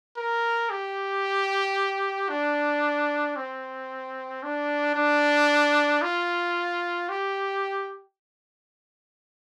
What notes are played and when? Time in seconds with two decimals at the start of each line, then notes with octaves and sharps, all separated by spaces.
0.17 A#4
0.70 G4
2.29 D4
3.36 C4
4.43 D4
4.95 D4
6.02 F4
7.09 G4